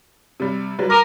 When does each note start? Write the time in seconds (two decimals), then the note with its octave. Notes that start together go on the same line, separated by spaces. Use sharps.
0.40 C3 G3
0.79 F#3 G3 B4
0.90 A#4 D6 D#7